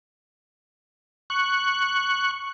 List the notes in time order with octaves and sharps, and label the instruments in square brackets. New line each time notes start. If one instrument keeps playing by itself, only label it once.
[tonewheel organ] C#6 F#6